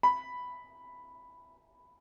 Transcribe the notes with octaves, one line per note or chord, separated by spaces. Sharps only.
B5